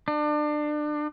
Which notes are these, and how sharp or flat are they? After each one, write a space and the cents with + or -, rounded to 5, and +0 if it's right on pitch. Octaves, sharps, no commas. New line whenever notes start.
D4 +30